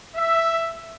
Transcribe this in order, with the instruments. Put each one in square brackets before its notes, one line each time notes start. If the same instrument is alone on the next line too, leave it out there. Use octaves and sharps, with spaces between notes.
[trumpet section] E5